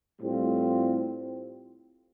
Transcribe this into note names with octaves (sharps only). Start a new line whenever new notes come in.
A2 G3 C4 F4